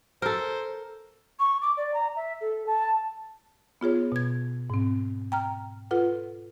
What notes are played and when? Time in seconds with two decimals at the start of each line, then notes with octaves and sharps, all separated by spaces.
0.22 A4 A#4 C5
1.39 C#6
1.62 D6
1.77 D5
1.94 A#5
2.16 E5
2.41 A4
2.66 A5
3.81 B3 F4 G#4 C#5
4.12 B2 G#6
4.70 G#2 C4
5.32 G5 A#5 F6
5.91 F4 A4 B4 F#5